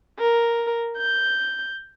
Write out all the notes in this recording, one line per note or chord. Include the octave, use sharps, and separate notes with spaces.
A#4
G6